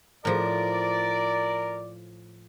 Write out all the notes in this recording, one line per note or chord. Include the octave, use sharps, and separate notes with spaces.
A2 F3 A#4 D5